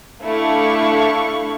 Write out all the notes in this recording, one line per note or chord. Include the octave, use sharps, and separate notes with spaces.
A3 D4 E4 F5 C#6